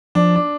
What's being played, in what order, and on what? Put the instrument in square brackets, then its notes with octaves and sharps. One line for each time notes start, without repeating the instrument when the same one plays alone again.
[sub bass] F3 [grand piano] D4
[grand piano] D4